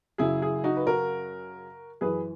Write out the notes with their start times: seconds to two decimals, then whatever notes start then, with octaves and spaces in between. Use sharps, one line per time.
0.18 F#2 C#3 F#3 E4 G#4
0.42 E4 G#4
0.64 D#4 F#4
0.77 B4
0.87 F#4 A#4
2.01 F#2 E3 G#4 B4